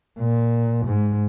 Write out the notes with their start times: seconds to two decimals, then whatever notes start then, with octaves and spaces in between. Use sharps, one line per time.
0.19 A#2
0.86 G#2